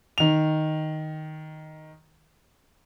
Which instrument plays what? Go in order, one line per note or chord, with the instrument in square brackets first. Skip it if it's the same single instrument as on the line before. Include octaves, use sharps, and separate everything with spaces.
[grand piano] D#3 F7